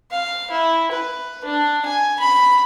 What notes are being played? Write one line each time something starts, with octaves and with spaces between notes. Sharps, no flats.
F5
E4
B4
D4
G#5
B5